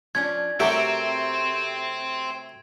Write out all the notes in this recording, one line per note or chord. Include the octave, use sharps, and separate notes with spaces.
F3 C#4 D4 G#6
C3 F#3 A3 C4 G4 A4 A#4 D7